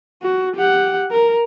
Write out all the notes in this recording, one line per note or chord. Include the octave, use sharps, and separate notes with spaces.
F#4
G4 F#5
A#4